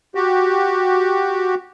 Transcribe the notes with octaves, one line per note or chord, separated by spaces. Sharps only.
F#4 G4